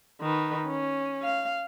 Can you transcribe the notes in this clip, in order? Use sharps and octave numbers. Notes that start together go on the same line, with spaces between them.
D#3 B4
C#4
F5